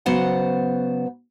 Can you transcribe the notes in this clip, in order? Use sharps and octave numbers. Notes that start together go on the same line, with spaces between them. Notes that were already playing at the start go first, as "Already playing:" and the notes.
C#3 F#3 B3 C5 D5 F#5